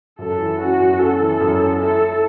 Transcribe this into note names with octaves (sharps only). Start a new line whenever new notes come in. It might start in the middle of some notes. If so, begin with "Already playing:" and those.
F#2 A4
E3
C#4 F#4
F#2
C#4 A4
E3
F#2
C#4
E4 A4
E4